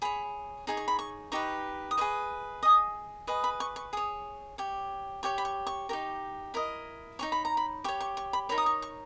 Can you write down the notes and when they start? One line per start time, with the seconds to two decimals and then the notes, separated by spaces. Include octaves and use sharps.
0.02 G#4 C#5 B5
0.67 D#4 G#4 C#5
0.77 C#6
0.88 B5
0.99 C#6
1.32 D#4 G4 B4 C#6
1.91 D#6
1.97 G#4 B4 D#5 C#6
2.63 G#4 D#5 D#6
3.27 G#4 B4 D#5 C#6
3.44 B5
3.60 C#6
3.76 C#6
3.93 G#4 C#5 D#6
4.58 G4 C#5
5.23 G4 C#5 C#6
5.38 B5
5.45 C#6
5.67 C#6
5.89 D#4 G4 A#4
6.54 E4 A#4 D#5
7.19 D#4 G#4 C#5 C#6
7.32 B5
7.45 A#5
7.57 B5
7.84 G4 C#6
7.88 C#5
8.00 C#6
8.17 C#6
8.33 B5
8.49 D#4 A#4 C#5 B5
8.58 D#6
8.66 C#6
8.82 C#6